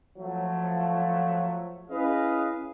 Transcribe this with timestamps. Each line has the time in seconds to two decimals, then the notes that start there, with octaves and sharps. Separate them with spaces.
0.18 F3 F#3 A3
1.90 C#4 E4 G#4 B4 D#5 F5